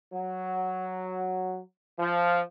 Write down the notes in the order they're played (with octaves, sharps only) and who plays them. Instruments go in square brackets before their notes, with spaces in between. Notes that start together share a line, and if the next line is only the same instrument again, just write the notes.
[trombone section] F#3
F3